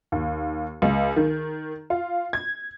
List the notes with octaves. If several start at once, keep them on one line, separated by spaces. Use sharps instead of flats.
D#2
C#2
D#3
F4
G#6